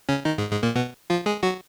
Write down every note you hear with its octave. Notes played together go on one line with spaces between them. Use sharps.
C#3 C#4
D#3 D#4
G#2 G#3
G#2 G#3
A#2 A#3
B2 B3
F3 F4
G#3 G#4
F#3 F#4